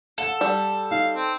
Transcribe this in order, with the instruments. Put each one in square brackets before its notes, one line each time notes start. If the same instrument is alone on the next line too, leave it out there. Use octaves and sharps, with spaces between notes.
[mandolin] A4 [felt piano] F5 F#5 A5
[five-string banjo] G3
[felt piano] D#4 [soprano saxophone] F5
[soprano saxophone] C4